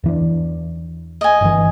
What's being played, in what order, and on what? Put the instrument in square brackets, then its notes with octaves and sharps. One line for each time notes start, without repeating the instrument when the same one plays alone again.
[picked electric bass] E2 E3 D4
[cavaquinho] D#5 G#5
[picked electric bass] G1 E3